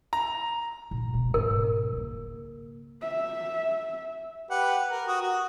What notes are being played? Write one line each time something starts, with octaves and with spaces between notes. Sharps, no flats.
A#5
A#2
D1 B2
G#2 C4 A#4
C#3 A#3
E5
G4 B4 F#5
A#4
F#4 D#6
F#4